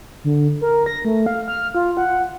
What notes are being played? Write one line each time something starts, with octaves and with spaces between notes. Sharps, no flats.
D3
A#4
A#6
A3
F5
F6
F4
F#5